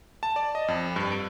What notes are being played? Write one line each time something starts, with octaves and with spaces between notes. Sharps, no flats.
A5
D5
D#5
F2
G2
D7